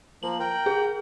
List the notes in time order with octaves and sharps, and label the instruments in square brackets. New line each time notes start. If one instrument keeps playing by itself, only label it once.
[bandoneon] F3 A#3 [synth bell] F#7
[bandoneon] A#4 G5
[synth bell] G#4